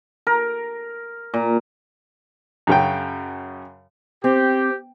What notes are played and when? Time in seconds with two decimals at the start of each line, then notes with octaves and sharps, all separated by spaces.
0.27 A#4
1.34 A#2
2.67 F#2 C#3 G5
4.24 C4 G4